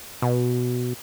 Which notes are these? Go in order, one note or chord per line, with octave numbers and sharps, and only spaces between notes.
B2